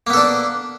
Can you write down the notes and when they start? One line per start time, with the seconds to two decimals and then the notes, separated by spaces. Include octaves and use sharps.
0.07 A#3
0.10 B3
0.13 A4
0.17 D4